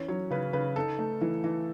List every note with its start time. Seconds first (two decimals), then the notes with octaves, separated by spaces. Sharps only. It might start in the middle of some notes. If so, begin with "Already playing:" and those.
Already playing: E3 C#4
0.08 F#3 C#5
0.30 C#3 B4
0.53 C#3 B4
0.76 D#4 A4
0.99 A3
1.21 E3
1.44 E3